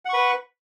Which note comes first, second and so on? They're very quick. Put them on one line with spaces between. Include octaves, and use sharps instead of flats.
F#5 C#6 B4